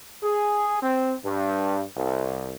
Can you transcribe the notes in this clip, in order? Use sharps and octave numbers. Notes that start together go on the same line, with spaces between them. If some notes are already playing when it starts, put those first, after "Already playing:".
G#4
C4
G2
C2